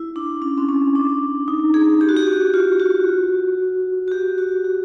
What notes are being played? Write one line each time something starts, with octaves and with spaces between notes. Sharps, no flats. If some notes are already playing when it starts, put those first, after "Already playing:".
Already playing: E4
D4
C#4
C4
C#4
D4
D#4
G#4
G4
F#4
G4
F#4
F4
F#4
F#4
G4
F#4
G4